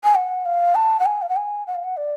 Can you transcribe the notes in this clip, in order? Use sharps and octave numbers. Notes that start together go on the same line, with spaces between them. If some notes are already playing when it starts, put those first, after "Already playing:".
G#5
F#5
F5
A5
F#5
G#5
F5
F#5
G#5
F#5
F5
F#5
D5